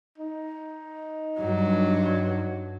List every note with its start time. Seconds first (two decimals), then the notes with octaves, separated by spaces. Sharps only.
0.18 D#4
1.40 G2 F#3